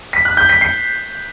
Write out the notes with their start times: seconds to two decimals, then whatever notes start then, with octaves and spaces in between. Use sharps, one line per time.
0.13 B6
0.25 F#6
0.37 G6
0.49 B6
0.61 C7